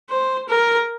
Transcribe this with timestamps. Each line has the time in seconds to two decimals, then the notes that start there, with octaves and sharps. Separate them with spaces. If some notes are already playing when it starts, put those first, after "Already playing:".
0.10 C5
0.49 A#4